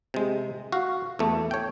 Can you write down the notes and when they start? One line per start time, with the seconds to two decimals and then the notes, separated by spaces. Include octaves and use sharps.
0.14 C3 G#3
0.72 F#4 F5
1.19 E2 A3
1.51 C#5 G5